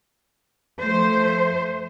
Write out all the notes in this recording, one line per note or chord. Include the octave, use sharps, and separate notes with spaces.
F3 A3 C5